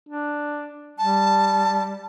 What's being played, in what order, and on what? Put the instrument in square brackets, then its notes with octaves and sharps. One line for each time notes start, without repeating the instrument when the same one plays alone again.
[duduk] D4
[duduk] G3 [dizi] A5